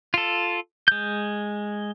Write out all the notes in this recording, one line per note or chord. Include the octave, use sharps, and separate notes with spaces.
F4 A4
G#3 G6